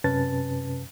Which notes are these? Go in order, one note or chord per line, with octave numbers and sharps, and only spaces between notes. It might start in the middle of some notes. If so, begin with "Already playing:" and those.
F#2 C3 C#4 B4 A5 A6